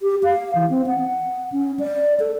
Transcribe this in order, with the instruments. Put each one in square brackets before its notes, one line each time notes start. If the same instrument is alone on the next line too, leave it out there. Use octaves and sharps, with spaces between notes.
[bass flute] G4
F5
E3
C4
F#5
C#4
D5
A4